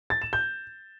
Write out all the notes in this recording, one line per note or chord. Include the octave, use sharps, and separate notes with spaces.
A6
E7
G6